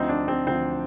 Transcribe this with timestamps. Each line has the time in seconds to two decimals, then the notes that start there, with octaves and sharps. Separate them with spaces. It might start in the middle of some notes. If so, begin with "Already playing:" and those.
Already playing: D2 D3 F3 C4 D#4
0.09 D4
0.28 C4
0.47 D2 D3 F3 C4